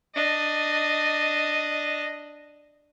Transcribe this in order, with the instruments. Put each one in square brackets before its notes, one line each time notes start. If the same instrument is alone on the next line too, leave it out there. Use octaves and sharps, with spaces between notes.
[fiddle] D4 D#5